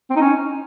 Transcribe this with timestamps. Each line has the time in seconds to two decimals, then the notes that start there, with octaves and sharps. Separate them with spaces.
0.10 C4
0.16 D#4
0.22 C#4